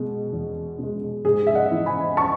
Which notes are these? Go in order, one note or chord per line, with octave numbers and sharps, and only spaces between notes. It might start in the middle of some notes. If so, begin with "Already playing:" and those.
Already playing: B2 G#3
E2
B2 G#3
G#2 G#4
E5
D#5 F#5
E3 B3 E4
G#5 B5
A5 C#6